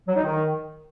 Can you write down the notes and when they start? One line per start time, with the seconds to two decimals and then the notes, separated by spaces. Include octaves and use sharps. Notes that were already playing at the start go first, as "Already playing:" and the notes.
0.08 F#3
0.16 D#4
0.24 D#3